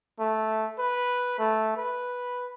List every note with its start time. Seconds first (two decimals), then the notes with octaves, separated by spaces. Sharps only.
0.19 A3
0.79 B4
1.39 A3
1.77 B4